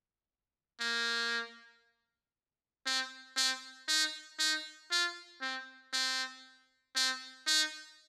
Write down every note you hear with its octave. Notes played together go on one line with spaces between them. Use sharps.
A#3
C4
C4
D#4
D#4
F4
C4
C4
C4
D#4